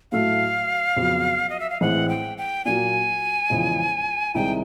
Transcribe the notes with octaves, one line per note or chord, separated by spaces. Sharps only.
A2 F#3 A3 F5
F2 C#3 F#3 B3
D#5
E5
F5
A1 A2 E3 G#3 C4 F#5
G5
G5
A#2 F#3 A#3 G#5
E2 C#3 F3 G#3
C2 C3 D#3 G#3 G5